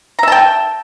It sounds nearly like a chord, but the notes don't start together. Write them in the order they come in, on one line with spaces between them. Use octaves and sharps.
A#5 E5 A5 G5